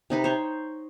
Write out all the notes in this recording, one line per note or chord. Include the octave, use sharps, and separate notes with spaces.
C3 D#4 B4
C5 C#5